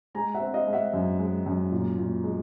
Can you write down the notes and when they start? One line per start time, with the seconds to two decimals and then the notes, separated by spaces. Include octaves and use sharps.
0.14 G#3 G#5 A#5
0.35 E5 F#5
0.40 C4
0.54 D#5 F5
0.67 G#3
0.73 E5 F#5
0.93 F#2
1.19 G#3
1.46 F#2
1.72 A#2
1.98 A#2
2.24 G#3